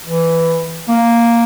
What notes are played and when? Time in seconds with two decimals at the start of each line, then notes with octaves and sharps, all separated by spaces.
0.05 E3
0.88 A#3